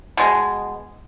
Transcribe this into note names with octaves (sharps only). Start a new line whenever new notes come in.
B2 G#3